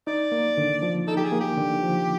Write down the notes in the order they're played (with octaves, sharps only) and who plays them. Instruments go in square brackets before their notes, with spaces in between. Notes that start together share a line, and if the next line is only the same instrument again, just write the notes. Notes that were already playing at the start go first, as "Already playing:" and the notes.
[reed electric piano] D#4 [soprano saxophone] D5
[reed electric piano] A#3
D3
F3
[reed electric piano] D#4 [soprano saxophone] A4
[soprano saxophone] G4
G#4
[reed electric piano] A#3
[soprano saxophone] G4
[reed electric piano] D3
F3